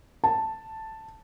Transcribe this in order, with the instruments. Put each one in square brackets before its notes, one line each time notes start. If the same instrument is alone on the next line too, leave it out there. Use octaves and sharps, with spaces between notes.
[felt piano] A5